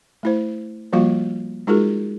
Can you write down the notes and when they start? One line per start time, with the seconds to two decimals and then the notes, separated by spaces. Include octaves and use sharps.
0.23 A3 E4 C5
0.93 F3 G3 A#3 F4 F#4 F5
1.67 G#3 D#4 F4 F#4 G#4 A#4